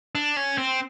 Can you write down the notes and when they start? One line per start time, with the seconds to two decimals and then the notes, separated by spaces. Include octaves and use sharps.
0.15 D4
0.37 C#4
0.58 C4